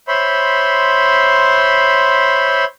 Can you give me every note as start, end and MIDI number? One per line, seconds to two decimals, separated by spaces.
0.08 2.65 72
0.08 2.65 73
0.08 2.65 76
0.08 2.65 83
0.08 2.65 84